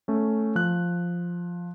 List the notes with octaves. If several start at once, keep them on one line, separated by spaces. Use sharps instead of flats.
A3 C#4
F3 F#6